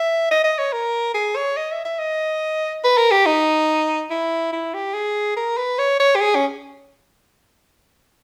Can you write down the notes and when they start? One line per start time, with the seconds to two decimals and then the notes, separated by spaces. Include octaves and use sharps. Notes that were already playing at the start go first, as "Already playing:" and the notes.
Already playing: E5
0.31 D#5
0.44 D#5
0.58 C#5
0.73 A#4
1.14 G#4
1.36 C#5
1.57 D#5
1.72 E5
1.85 E5
1.99 D#5
2.84 B4
2.97 A#4
3.11 G4
3.26 D#4
4.10 E4
4.53 E4
4.74 G4
4.94 G#4
5.36 A#4
5.57 B4
5.79 C#5
6.00 C#5
6.15 G4
6.21 G#4
6.35 C#4